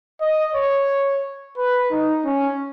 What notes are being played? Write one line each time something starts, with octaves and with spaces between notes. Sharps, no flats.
D#5
C#5
B4
D#4
C#4